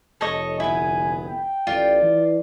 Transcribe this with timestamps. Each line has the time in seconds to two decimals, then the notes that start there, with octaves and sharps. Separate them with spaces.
0.21 F1 A4 C#5 D#5
0.60 D2 B3 E4 G#5
1.28 G5
1.67 A1 F4 D5
2.02 E3